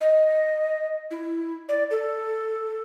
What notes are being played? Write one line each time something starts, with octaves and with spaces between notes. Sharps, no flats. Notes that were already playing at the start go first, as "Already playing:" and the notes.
D#5
E4
D5
A4